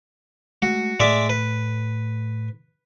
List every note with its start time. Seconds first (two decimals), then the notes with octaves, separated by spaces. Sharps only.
0.62 G#3 A3 F#4
1.00 A2 G#3 A3 D5 E5
1.29 B4